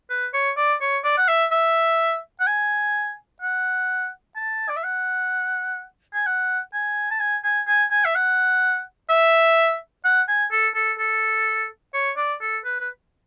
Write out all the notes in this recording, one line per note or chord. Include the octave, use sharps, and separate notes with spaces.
B4
C#5
D5
C#5
D5
F#5
E5
E5
F#5
G#5
F#5
A5
D5
E5
F#5
G#5
F#5
G#5
A5
G#5
G#5
G#5
G#5
E5
F#5
E5
F#5
G#5
A4
A4
A4
C#5
D5
A4
B4
B4